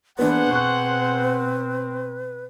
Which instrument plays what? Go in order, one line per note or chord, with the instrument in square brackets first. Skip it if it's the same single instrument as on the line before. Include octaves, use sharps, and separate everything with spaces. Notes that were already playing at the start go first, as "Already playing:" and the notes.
[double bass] E3 A#3 [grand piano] B3 D4 [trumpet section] G#4 C5 F#5 [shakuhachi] B4
[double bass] B2 C4 [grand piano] C#6 F#6